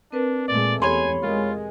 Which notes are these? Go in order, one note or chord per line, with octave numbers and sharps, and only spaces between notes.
C4 D4 A#4 B4
A#2 G#3 A3 D5
E2 G4 A4 C#5 G#5 B5 C6
G#3 F4 A#4